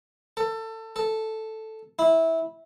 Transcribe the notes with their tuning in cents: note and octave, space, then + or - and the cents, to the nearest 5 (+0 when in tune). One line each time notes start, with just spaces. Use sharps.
A4 +25
A4 +0
E4 -15